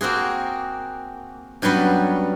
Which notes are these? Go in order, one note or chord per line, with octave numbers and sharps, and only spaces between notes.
A#3 C4 F#4 G#4
G2 F#3 G3 B3 C#4